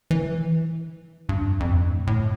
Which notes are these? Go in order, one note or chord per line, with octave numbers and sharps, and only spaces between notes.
E3
G2
F2
F2
G2
A2
A2